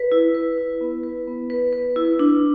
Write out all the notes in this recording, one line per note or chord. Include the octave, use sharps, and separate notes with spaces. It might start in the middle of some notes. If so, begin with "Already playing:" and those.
Already playing: B4
E4
B4
E4
B3
B4
B3
B4
B4
E4
D4